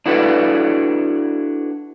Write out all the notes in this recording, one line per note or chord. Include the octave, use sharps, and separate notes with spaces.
D4 E4 F#4 A4 B4 D5